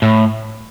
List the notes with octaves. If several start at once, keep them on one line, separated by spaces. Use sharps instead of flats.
A2